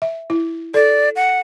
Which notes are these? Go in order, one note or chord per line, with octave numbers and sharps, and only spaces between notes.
E5
E4
A4 D5
F#5